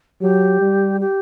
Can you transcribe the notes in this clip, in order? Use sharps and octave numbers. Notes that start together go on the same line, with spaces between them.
F#3 G4
G3
G4